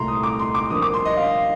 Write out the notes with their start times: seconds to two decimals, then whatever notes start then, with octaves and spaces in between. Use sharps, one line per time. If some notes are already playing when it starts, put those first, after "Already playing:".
Already playing: C2 A#2 A3 A#5 C6
0.08 D#6
0.23 D6
0.40 C6
0.55 D6
0.70 G2 F3 A#3 D#6
0.82 D6
0.94 C6
1.05 D#5
1.17 F5